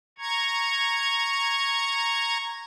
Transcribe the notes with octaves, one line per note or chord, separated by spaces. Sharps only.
A#5 C#6 G#6